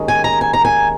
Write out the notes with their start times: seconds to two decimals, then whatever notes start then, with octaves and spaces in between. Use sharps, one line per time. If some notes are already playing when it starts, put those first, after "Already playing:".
Already playing: D#2 D#3 G#3 C#4
0.08 G#5
0.24 A#5
0.41 G#5
0.53 A#5
0.65 G#5